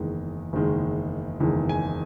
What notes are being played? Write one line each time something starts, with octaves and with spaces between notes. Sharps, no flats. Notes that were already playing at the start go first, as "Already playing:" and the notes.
Already playing: F#1 E2 D#3 G#3
F#1 E2 D#3 G#3
F#1 E2 D#3 G#3
G#5